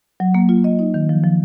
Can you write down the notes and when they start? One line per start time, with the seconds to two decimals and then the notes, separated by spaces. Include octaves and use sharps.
0.20 F#3
0.35 A#3
0.49 F4
0.64 D#5
0.79 D#4
0.94 D#3
1.09 F3
1.24 F3